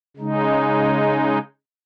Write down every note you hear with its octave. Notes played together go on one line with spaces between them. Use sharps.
C#3 G#3 D#4